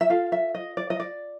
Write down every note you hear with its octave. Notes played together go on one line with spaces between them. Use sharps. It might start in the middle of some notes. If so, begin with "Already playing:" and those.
E5
F4 A4 F5
E5
D#5
D5
D#5
D5